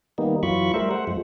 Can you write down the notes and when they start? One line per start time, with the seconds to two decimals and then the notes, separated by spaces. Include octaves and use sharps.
0.18 D#3 G3 A#3 B3 D#4
0.43 F#2 E3 F#3 F4 B5 C#6
0.74 G3 A3 A#4 C5 E5
0.91 A3 C5 F#5
1.07 F#2 F3 G#3